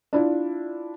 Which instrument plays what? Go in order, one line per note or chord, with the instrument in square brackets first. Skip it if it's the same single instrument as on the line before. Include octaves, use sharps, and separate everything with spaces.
[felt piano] D4 E4 F4